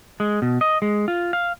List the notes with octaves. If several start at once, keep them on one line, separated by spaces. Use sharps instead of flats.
G#3
B2
D#5
G#3
F4
F5